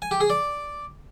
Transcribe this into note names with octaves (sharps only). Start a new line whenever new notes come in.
G#5
G4
G#4
D5